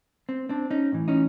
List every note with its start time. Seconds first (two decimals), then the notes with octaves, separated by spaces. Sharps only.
0.29 C4
0.49 C4 D4
0.71 C#4 D#4
0.92 A2 E3
1.08 C#4 D#4